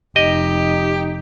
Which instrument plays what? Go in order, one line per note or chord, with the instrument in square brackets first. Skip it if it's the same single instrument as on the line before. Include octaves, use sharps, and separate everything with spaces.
[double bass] F1 D#4 [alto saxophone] G4 [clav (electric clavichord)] D#5